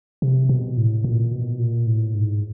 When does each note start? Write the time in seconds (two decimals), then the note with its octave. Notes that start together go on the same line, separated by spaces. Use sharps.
0.22 C3
0.49 B2
0.77 A2
1.04 A#2
1.32 B2
1.59 A#2
1.87 A2
2.14 G#2